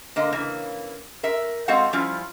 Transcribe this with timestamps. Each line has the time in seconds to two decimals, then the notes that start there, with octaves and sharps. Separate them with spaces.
0.16 D3 A#3 D#5
0.32 C#3 E3 A#3
1.23 A#4 E5
1.68 G#3 C4 F#4 A4 F5 F#5
1.93 F3 G3 C#4 E4 F4